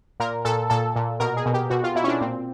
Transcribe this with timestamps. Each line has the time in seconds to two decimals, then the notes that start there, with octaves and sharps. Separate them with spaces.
0.20 A#2 A#4
0.45 A#2 A4
0.70 A#2 A4
0.96 A#2
1.20 B2 A#4
1.37 G#4
1.46 B2
1.54 G4
1.70 B2 F#4
1.84 F4
1.95 B2 E4
2.04 C#4
2.08 D4
2.21 A#2 C4